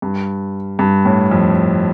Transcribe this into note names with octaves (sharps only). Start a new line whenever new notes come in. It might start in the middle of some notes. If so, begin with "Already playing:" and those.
G2
G2
A2
F2